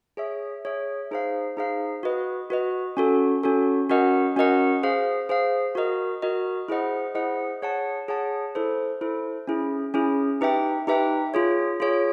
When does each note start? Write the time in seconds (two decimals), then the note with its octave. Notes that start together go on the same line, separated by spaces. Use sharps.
0.17 G#4 C#5 E5
0.65 G#4 C#5 E5
1.11 D#4 G#4 C5 F5
1.57 D#4 G#4 C5 F5
2.03 F#4 B4 D#5
2.50 F#4 B4 D#5
2.97 C#4 F#4 A4
3.43 C#4 F#4 A4
3.90 C#4 F#4 A#4 D#5 F#5
4.36 C#4 F#4 A#4 D#5 F#5
4.83 G#4 C5 F5
5.29 G#4 C5 F5
5.75 F#4 A#4 D#5
6.22 F#4 A#4 D#5
6.68 E4 G#4 C5 D#5 F#5
7.15 E4 G#4 C5 D#5 F#5
7.62 G#4 C#5 F#5 A5
8.08 G#4 C#5 F#5 A5
8.55 E4 A4 C5
9.01 E4 A4 C5
9.47 C#4 E4 G#4
9.94 C#4 E4 G#4
10.41 D#4 G4 B4 E5 G5
10.87 D#4 G4 B4 E5 G5
11.34 F4 G#4 C#5
11.80 F4 G#4 C#5